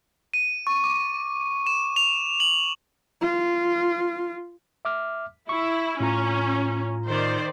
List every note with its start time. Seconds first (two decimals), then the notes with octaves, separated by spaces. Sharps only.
0.34 D#7
0.67 C#6
0.84 D6
1.67 E7
1.96 F7
2.40 F#7
3.22 F4
4.85 E5 D6 F6
5.49 E4 C#6
6.00 A2 C#4 F4 A#5
7.09 D#3 C5 D5